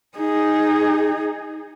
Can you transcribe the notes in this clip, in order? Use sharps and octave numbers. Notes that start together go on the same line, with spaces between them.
D#4 G#4